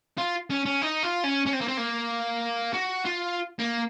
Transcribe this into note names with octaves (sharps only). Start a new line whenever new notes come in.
F4
C#4
C#4
D#4
F4
C#4
C#4
C4
A#3
C4
A#3
F#4
F4
A#3